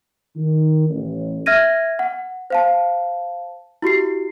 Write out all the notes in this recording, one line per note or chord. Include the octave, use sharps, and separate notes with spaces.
D#3
A1
E5 F6 G#6 A#6 D#7
F#5
C5 F5 A5
E4 F#4 G4 C7